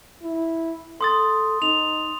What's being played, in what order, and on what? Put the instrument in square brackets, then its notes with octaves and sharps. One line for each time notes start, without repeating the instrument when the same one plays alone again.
[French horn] E4
[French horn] A4 [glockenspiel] C6 D#6 A6
[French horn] D#4 [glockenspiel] F7